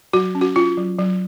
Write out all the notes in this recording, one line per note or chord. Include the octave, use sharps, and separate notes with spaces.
F#3 F#4
C#4
F#4
C#4 F4
F#3
F#3